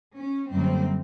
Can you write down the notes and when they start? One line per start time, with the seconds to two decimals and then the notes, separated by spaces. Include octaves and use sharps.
0.17 C#4
0.50 F#2 D3 G3 A#3 C4